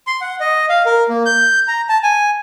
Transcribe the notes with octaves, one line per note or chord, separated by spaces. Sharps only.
C6
F#5
D#5
F5
A#4
A#3
G6
A#5
A5
G#5